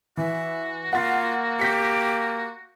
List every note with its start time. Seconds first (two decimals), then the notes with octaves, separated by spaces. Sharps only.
0.17 E3 F#4 E5
0.93 A#3 F4 F#5 A6
1.59 G4 G6 B6 C#7